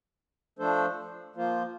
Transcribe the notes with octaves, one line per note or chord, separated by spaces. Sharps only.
F3 A3 D4 A4 C5
F3 A#3 F4 C5